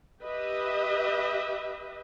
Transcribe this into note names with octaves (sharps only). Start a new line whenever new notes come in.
G4 B4 D#5 E5